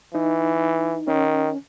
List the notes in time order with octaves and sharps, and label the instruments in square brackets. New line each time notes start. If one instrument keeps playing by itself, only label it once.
[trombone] E3 [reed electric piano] D#4
[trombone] D#3 [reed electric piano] C#4